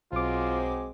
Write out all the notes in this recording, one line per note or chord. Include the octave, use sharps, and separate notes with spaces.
B1 F#3 G#3 C4 F4 D6